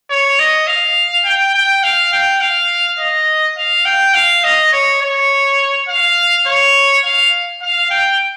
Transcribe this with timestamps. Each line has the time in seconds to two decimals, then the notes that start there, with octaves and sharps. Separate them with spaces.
0.10 C#5
0.39 D#5
0.67 F5
1.25 G5
1.54 G5
1.83 F5
2.12 G5
2.41 F5
2.99 D#5
3.57 F5
3.85 G5
4.14 F5
4.44 D#5
4.73 C#5
5.02 C#5
5.89 F5
6.47 C#5
7.04 F5
7.62 F5
7.91 G5